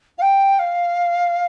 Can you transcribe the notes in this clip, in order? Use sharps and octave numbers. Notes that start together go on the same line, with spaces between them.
F5
G5
F5